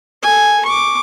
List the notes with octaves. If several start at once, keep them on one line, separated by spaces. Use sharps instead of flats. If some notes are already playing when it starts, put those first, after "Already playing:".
A4 G#5
C#6 D6